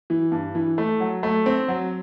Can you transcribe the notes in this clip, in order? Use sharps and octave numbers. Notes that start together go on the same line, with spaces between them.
E3
G2
E3
A3
F#3
A3
C4
F#3